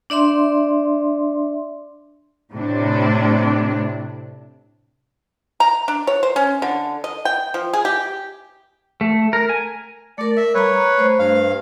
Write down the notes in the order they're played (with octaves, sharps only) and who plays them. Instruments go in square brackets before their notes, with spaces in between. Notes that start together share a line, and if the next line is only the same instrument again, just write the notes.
[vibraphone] D4 D5 E5 C6
[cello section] A2 C3 D4
[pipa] A#5
D4
C#5
C5
C#4
D3
D#5
G5
F3
G#4
G4
[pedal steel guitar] A3
A#4
G#5
[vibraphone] A3 A#4 [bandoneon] D5
[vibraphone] A#4 [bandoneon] E5
[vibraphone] G3 A#5 [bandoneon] B4 C#5
[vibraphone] A#5
A3 C5
[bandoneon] G2 F5